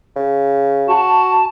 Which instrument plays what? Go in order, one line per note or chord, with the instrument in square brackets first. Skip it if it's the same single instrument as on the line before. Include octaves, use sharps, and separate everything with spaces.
[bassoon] C#3
[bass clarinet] F#4 [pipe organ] A5